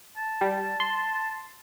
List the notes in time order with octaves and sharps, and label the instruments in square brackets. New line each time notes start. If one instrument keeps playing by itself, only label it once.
[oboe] A5
[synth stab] G3
C6